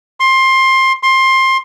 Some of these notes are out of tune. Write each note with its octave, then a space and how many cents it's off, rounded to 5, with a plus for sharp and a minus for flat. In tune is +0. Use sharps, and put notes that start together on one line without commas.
C6 +20
C6 +20